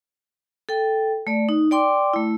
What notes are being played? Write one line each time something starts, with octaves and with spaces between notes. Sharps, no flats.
A4 G5
A3 D5
D#4
D5 G5 C6 D6
A3 E4